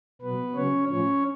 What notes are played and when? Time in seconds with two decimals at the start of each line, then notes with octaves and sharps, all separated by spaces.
0.21 B2 F#3 B3 B4
0.54 C#3 F#3 C#4 C#5
0.88 A2 F3 C#4 C#5